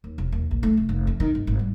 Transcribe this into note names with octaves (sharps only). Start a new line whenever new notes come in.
D#2
E1
D#2
A#1
A3
F1
F1
F2
D#3
G#1
G#1
G3